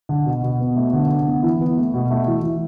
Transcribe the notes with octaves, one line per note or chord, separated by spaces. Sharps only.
D3
B2
B2
B3
A3
D3
D3
B3
E3
B3
A3
B2
A3
E3
E3